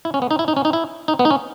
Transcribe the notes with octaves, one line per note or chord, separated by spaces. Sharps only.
E4
C#4
B3
D#4
E4
D#4
C#4
D#4
E4
D#4
B3
D#4
C#4